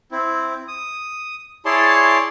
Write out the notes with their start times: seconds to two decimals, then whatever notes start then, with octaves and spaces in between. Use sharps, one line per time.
0.12 C4 E4
0.68 D#6
1.65 E4 G#4 C#5 D5 A5 C6